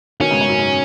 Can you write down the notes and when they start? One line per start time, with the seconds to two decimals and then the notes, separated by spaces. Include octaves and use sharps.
0.20 B2 D#3 C#4
0.30 G#2 C#3
0.41 G#2
0.49 F#2
0.59 G#2